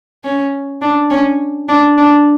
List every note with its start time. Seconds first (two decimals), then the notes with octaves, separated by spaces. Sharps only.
0.24 C#4
0.82 D4
1.10 C#4
1.68 D4
1.98 D4